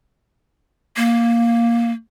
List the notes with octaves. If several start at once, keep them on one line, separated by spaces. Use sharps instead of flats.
A#3